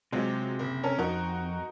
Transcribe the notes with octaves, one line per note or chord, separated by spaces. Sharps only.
C3 F#3 G#3 F4
F#1
C#4 A4 A#4
F2 D#4 F#4 A#4